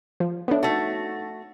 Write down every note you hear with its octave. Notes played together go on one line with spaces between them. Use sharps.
F3
B3 D4 A4 C#5 E5
A3 D#4 F#4 A5 A6